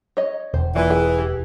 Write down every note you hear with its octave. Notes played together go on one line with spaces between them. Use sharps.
C#5 D#5
E1 C5
E3 A#3 F4 D5
G#4 G5
G4